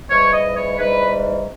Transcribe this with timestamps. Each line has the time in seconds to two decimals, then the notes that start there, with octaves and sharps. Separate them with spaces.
0.09 G#2 E3 G3 C#5
0.32 D#5
0.55 C#5
0.77 G#2 E3 G3 B4